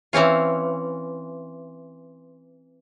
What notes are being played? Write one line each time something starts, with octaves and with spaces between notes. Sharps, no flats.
E3 C4 C#4 F4